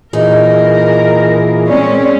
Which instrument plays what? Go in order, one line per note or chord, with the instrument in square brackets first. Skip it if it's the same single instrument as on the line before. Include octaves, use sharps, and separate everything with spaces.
[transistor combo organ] A#2 E3 G#4 [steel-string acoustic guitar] D#4 [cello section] A#4
[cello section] G#3 C4 C#4 [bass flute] D5